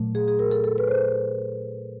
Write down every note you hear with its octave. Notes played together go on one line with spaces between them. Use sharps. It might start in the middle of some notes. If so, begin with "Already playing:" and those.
Already playing: A#2 F#3 A3
G#4
G#4
A#4
A4
A4
B4
C5